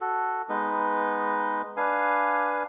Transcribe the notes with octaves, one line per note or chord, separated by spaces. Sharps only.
F#4 A4
G#3 B3 D#4 B4
D4 B4 F5 G#5